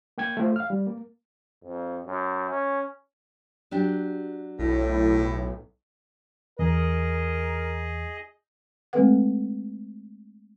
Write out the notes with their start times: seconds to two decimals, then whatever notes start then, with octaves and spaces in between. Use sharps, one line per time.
0.18 A#3 G5 G#6
0.37 A3 F4 C5
0.56 F5 F6
0.70 G3
0.87 A#3
1.64 F2
2.07 F#2
2.50 C#4
3.71 F#3 D4 G4
4.59 B1 A2
6.59 E2 G#4 A#4 D#5
8.93 G#3 A3 C4 A4 B4 F#5